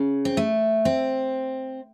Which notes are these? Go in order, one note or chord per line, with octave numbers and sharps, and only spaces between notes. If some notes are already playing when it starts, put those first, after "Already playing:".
Already playing: C#3
C4
A3
C4